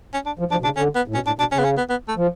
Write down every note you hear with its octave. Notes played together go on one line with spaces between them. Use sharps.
C#4
D4
F3
F3 D4
B2
C#3 D4
D3 C#4
B3
A2
B2 C#4
A2 D4
B2 D4
C#3 C#4
B3
C#4
B3
B3
A3
F3